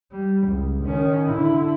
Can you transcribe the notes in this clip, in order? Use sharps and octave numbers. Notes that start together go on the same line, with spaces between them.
G3
C#2
D#3 C#4
D3 E4